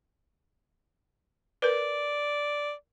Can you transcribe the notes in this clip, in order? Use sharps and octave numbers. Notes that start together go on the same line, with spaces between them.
A#4 B4 D5